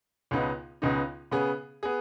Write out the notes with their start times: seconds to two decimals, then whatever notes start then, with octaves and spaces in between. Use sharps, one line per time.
0.31 C#2 C#3 B3 D#4
0.82 C#2 C#3 B3 D#4
1.31 C#3 B3 G#4
1.83 B3 G#4